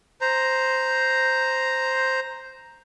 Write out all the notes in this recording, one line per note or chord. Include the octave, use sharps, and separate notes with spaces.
C5 A#5